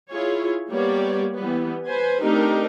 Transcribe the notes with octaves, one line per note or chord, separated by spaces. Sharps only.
E4 F4 G#4 C#5
G3 A#3 B3 G4 C#5 D5
E3 G3 B3
B4 C5 G#5
A3 C4 D4 D#4 G4 A#4